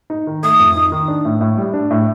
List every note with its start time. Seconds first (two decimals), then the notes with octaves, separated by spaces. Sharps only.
0.10 D#4
0.27 D#3
0.43 A3 D#6
0.60 F2
0.76 D#4
0.92 D#3
1.08 D4
1.25 A2
1.41 A2
1.57 G3
1.73 D4
1.91 A2